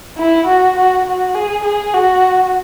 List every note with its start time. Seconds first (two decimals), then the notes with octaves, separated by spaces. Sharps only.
0.18 E4
0.47 F#4
0.76 F#4
1.06 F#4
1.35 G#4
1.65 G#4
1.94 F#4